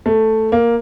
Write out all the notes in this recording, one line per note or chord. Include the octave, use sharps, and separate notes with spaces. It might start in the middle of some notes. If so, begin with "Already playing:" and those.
A3
A#3